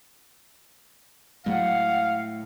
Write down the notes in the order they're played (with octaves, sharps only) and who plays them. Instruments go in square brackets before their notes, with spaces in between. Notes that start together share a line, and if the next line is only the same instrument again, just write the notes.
[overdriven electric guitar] A2 [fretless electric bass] F#3 G#3 [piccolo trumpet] F5 [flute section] F#5